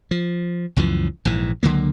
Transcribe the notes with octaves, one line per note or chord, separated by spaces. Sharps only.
F3
C#2 F#2 E3 F3
A#1 G#2 E3
C#2 D3 F#3 A#3